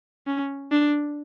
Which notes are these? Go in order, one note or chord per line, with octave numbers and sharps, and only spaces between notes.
C#4
D4